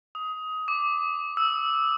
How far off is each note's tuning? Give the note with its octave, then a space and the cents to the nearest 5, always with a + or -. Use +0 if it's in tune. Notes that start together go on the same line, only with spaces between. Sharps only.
D#6 +20
D6 +0
E6 -5